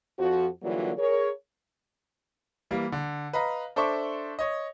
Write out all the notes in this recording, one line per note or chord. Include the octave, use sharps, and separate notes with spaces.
F2 F3 F#4
D3 E3 F#3 G3 A#3 F4
G#4 A#4 C#5
E3 G3 A#3
D3
B4 D#5 F5 A#5
D4 A4 C5 E5 C#6 D6
C#5 D#5